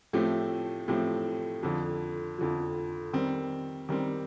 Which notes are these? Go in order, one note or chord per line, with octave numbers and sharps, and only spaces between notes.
A2 F3 A3 C4 G4
A2 F3 A3 C4 G4
F2 D3 F3
F2 D3 F3
D#3 G3 C4
D#3 G3 C4